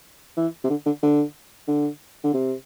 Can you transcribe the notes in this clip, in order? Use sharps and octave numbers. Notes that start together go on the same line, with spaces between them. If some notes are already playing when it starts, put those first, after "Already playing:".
E3
C3
D3
D3
D3
D3
D3
C3